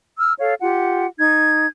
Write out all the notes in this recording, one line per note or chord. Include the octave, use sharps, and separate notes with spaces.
E6 F6
A4 C#5 F5
F4 G4 F#5
D#4 G#6